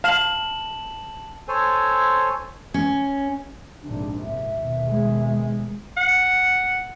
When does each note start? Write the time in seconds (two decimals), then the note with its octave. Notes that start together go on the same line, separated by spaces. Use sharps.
0.04 F5 A5 E7 F#7
1.48 A4 C5 C#5 G#5
2.74 C#4
3.83 A#1 G#2 C3 D4
4.22 E5
4.51 D#2 B2
4.88 G#3
5.97 F#5